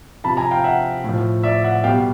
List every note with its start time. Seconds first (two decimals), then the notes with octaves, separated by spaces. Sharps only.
0.24 C3 F3 A5 B5
0.37 G#5 A#5
0.51 F5 G5
0.64 E5 F#5
1.04 A2 F3
1.43 D5 E5
1.64 E5 F#5
1.84 B2 F5 G5
1.87 G3